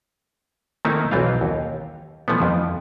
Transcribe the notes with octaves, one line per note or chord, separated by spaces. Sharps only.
D#3 A3 A#3 C4 D#4 E4
B1 E3 C4 F4 F5
D#2
E3 F3 A3 B3
F2 F3